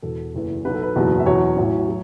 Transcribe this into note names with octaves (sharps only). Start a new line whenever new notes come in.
E1 E2 B2 A4
F#1 E2 E3
B1 B2 F#3 B4
A4
B4
F#1 E2 B2 F#3
E5
E2 B2 F#3 C#5
A1 A2 F#3 C#5
F#3